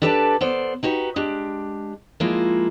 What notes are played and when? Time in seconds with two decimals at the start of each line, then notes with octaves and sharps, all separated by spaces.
0.02 D4 G4 A4 B4 E5 A5
0.41 B3 A4 C5 D5
0.83 D#4 F#4 G4 B4
1.16 G#3 D4 G4
2.20 F3 G#3 A#3 E4 F4